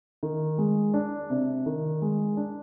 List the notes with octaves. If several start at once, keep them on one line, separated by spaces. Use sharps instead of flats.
D#3
G#3
D4
C3
D#3
G#3
D4